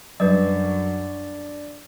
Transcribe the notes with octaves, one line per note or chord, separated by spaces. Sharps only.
F#2 F#3 G3 D4 B4 D5